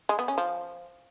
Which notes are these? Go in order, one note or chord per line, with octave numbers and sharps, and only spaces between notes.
G#3
B3
C#4
F3